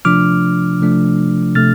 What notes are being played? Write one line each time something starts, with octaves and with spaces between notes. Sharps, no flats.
C3 F3 A3 D4 D6 F6
C3 F3 A3 D4
C3 F3 A3 D4 F6 A6